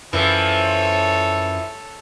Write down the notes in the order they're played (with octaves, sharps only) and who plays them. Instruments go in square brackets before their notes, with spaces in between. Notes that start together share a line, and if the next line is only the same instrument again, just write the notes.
[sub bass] F#2 [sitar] E3 F3 [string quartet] A4 C#5